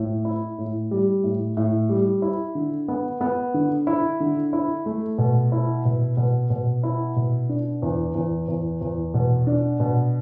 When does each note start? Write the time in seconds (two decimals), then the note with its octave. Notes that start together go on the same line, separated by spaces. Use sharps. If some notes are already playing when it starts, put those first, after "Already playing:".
Already playing: A2
0.25 E4
0.58 A2
0.91 G3
1.24 A2
1.57 A2
1.89 G3
2.22 E4
2.55 D3
2.88 B3
3.21 B3
3.54 D3
3.87 E4
4.20 D3
4.53 E4
4.86 A3
5.18 B2
5.52 E4
5.85 B2
6.17 B2
6.50 B2
6.83 E4
7.16 B2
7.49 D4
7.82 E2
8.15 E2
8.48 E2
8.81 E2
9.14 B2
9.47 D4
9.80 B2